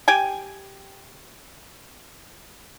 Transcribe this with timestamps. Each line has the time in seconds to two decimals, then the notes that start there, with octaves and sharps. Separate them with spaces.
0.08 G4 G5 G#5